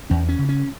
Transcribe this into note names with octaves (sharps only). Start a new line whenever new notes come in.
E2 C#4
C#4
C#3
C#4